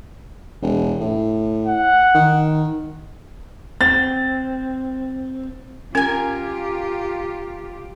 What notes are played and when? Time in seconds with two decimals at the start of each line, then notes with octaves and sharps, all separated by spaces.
0.62 E1
1.01 A2
1.67 F#5
2.14 D#3
3.81 C4 A6
5.95 C#4 F4 G4 A#4 G#5